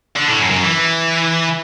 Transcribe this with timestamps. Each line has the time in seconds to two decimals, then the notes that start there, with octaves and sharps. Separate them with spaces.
0.16 D3
0.28 A2
0.40 F#2
0.51 F#2
0.63 E3